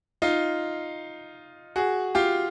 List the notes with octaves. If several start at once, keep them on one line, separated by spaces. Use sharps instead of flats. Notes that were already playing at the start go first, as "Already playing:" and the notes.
D#4 F4
F#4 G#4
F4 G4